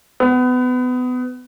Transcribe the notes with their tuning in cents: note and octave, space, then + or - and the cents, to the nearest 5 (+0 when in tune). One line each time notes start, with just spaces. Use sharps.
B3 +25